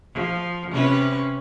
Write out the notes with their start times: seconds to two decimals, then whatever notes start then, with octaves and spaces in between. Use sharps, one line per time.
0.13 F3
0.71 C3 C#4 B4